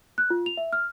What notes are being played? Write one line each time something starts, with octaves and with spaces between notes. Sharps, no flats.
F#6
F4
F7
E5
F6